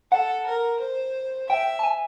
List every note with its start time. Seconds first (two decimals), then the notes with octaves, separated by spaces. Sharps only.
0.12 A4 F#5
0.46 A#4
0.80 C5
1.49 E5 G5
1.79 A5
1.83 G#5